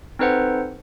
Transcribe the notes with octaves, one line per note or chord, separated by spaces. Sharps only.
C4 D#4 A4 B4 C5 F#5